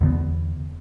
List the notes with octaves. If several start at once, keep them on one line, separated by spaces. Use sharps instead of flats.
E2 D3 B3